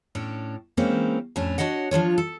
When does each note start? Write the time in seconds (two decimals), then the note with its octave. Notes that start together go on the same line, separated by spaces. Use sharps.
0.15 A2 C#4 D4
0.77 E3 G#3 A#3 C4 C#4 D#4
1.36 F2 A2 A3 C#4 D4
1.58 D4 E4 F#4 C#5 D#5 F#5
1.91 F3 D4 F4 C#5
2.18 A4